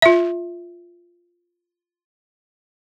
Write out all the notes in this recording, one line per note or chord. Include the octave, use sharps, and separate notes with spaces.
F4 E5